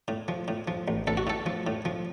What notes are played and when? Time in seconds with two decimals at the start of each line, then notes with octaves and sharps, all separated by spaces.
0.08 A2
0.28 F3
0.48 A2
0.68 F3
0.88 A1
1.07 A1 A4
1.17 F#4
1.27 A2 A4
1.46 F3
1.67 A2
1.85 F3